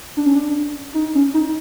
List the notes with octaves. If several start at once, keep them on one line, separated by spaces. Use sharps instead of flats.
D4
C#4
D4
D#4
C#4
D#4